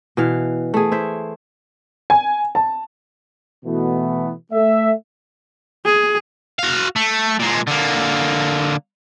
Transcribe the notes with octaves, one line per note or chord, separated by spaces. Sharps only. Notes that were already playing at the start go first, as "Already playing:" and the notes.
B2 E3 F5
A3 G#4
E4 C5 E5
G#5
A5
B2 E3 A3 B3
A3 E5
G#4
F#4 F5
A3
A#2 G#3
D3 A#3